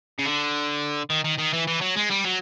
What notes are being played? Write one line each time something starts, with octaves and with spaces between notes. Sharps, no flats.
C#3
D3
D#3
D#3
D#3
E3
E3
F#3
G#3
G3
F#3